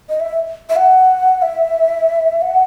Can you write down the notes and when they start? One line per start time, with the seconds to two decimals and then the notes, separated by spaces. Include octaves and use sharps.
0.09 D#5
0.20 E5
0.69 E5
0.76 F#5
1.42 E5
2.41 F#5